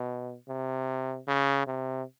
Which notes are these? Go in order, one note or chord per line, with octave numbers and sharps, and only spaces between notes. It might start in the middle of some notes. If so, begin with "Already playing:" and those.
Already playing: B2
C3
C#3
C3